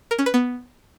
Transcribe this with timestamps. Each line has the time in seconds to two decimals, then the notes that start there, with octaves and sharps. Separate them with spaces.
0.11 A#4
0.19 C#4
0.26 B4
0.34 B3